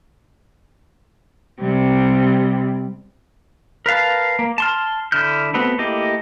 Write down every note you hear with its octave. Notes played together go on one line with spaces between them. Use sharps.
C3 G3
A#4 B4 F5 A5
A#3
A5 C6 F6
D3 E4 F6 G6
A3 B3 C4 F#4
A3 A#3 E4 G4 D#5